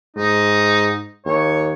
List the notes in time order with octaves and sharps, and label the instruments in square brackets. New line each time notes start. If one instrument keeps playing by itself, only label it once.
[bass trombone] G#2 [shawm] D#4
[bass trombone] D#2 [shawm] C#5